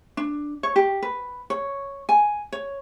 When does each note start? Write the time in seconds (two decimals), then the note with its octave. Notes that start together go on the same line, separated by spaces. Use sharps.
0.17 D4
0.63 C#5
0.76 G4
1.02 B4
1.50 C#5
2.09 G#5
2.52 C#5